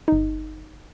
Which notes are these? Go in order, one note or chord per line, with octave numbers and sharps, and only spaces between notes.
G1 D#4